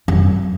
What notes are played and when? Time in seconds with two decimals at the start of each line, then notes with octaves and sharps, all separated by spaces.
0.08 F#2